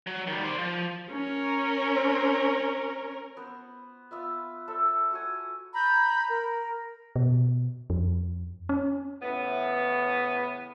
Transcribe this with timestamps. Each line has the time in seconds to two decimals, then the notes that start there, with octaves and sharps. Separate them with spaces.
0.07 F#3
0.27 D#3 G3
0.44 C5 D5
0.58 F3
1.10 C#4 A#4
3.37 B3 C5
4.11 B3 F4 E5
4.68 A4 C5 E5
5.11 F#4 F#5 G#5
5.74 A#5 B5 G6
6.29 A#4
7.16 B2
7.90 F2
8.69 C#4
9.22 A2 C#3 E3 B3